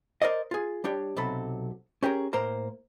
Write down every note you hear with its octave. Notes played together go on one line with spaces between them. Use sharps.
A#4 C5 D5 D#5
F4 G#4
G3 D4 G4 C#5
B1 C3 F#3 A4 B5
C#4 G4 G#4 A#4
A2 A#3 A#4 C5 A#5